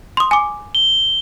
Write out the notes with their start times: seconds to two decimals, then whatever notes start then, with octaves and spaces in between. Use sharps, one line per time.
0.17 C6 D#6
0.31 G#5 D6
0.75 G7